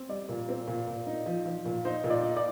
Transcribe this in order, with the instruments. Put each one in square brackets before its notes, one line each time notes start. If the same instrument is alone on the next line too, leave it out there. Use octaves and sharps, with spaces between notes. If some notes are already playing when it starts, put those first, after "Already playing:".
Already playing: [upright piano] C4
G3 D5
A#2
C4
A#2
A#2
D#4
F3
F3
A#2
D#4 C5
A#2
D5
D#4
D5